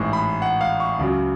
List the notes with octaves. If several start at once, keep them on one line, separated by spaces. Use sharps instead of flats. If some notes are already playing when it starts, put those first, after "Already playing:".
Already playing: A1 G#2 G#3 C#6
B5
F#5
F5
C#6
C#2 C#3 F#3